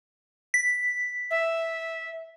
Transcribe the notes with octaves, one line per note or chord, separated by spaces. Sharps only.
B6
E5